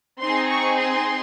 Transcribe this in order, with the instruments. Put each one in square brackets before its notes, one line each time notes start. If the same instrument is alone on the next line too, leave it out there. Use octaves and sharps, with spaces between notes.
[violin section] C4 D#4 G#4 C6
C#6
C6